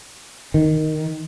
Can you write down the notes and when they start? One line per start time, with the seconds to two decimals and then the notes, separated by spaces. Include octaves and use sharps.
0.54 D#3